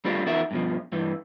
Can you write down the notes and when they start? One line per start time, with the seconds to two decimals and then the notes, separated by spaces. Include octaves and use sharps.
0.05 G3 A3 C4 D4 F4 G4
0.26 E2 D#4 F4 F#4 A#4 E5
0.51 G2 B2 F3
0.92 G2 E3